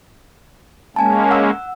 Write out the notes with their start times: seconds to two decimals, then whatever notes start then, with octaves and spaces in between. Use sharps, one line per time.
0.96 G#3 A#3 C#4 G#5 A5
1.31 F#5 E6